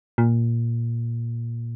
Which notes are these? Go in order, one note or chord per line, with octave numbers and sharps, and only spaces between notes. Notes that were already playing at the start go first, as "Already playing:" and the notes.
A#2